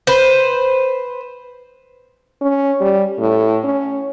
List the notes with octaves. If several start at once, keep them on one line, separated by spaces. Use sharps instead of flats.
B4 C5
C#4
G3
A2
C#4